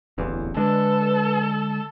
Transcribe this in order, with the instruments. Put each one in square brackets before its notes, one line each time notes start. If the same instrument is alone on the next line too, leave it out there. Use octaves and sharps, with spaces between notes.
[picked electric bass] D1 A1 E2
[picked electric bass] D3 G#3 D4 [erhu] A4 [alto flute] B4